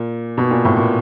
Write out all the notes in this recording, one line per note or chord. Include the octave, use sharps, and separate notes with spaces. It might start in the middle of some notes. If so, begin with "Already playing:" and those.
Already playing: A#2
B2
A#2
A2
A#2